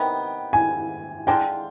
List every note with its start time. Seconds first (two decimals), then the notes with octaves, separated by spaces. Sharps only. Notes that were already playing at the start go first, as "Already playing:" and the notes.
Already playing: C3 D#3 B3 G5
0.53 G#5
1.27 D3 G#3 D4 F4 G5